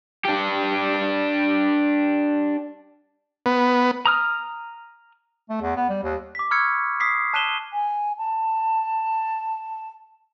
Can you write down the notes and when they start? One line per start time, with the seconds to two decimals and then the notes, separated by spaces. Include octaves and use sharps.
0.25 D4 G4
3.46 B3
4.06 A#5 D#6 F6
5.50 A3
5.61 E2
5.76 B3
5.89 G3
6.03 D#2
6.35 D6 B6
6.51 B5 C#6 E6 F6 G#6 C#7
7.00 D#6 B6 C7
7.34 A5 F#6 B6 D#7 E7 G7
7.73 G#5
8.18 A5